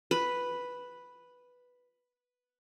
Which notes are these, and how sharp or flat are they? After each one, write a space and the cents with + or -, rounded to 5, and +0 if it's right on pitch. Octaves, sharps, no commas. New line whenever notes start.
B4 +0